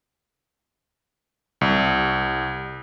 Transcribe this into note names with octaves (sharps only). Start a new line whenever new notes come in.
C2